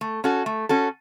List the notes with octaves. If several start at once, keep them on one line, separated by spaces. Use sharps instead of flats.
A3
C#4 F#4 A4
A3
C#4 F#4 A4